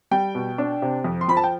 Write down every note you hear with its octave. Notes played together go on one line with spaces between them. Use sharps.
G3 G5
B2
D4
C3
F2
C6
F3 B5
A5
G5